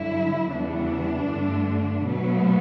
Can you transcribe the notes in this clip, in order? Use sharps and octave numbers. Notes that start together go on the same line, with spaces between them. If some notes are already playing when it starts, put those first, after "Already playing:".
Already playing: G2 D3 F#3 E4
E2 C#3 E3 G3 B3 D4
G2 D3 A3
B2 F#3 A3 B3